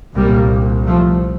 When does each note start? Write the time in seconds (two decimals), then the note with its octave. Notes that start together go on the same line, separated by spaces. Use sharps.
0.15 C2 A#2 G3 A#3
0.86 F3 A3